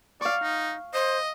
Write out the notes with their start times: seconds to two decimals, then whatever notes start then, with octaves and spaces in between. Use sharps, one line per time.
0.21 D5 F5 C#6
0.42 D#4
0.94 C5 D#5